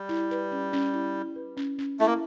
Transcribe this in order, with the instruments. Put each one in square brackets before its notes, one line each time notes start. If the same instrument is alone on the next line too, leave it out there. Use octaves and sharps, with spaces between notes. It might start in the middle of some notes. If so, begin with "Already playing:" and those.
Already playing: [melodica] G3
[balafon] E4
B4
C#4
C#4
E4
E4
B4
C#4
C#4
[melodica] A3 [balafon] E4
[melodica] A#3